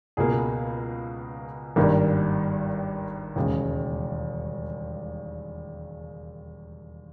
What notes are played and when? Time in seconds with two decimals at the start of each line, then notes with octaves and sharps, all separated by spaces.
0.17 C#2 B2 A#3 G#4
1.76 G#1 G2 D#3 G3 A#3
3.36 E1 D#2 C#3 G#3